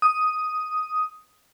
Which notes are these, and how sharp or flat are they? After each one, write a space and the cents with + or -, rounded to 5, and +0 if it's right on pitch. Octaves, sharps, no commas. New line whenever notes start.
D#6 +5